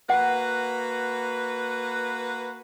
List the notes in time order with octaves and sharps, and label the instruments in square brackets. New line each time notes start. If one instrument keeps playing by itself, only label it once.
[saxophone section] A#3 F#4 B4 [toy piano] F#5